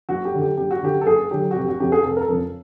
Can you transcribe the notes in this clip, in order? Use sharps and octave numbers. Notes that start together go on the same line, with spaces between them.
F#1 F#4
G4
F#2 D3 F#3
G4
F#1 G4
F#4
F#2 D3 F#3 G4
A4
F#1 G#4
F#2 D3 F#3 G4
F#4
F1 G4
F#4
F2 C#3 G4
G#4
F1 A4
A#4
A4
F2 C#3